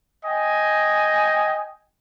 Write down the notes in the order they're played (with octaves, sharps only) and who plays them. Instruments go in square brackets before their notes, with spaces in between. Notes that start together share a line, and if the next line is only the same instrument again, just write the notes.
[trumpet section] D#5 G5 G#5